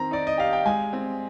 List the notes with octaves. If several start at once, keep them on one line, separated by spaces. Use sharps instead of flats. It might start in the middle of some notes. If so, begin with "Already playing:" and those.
Already playing: D#3 C4 A#5
D#4 D5
D#5
G4 F5
G5
G#3 G#5
C4